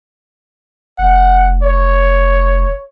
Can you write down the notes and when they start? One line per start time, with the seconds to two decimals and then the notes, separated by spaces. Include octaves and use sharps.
0.98 F1 F#5
1.63 C#5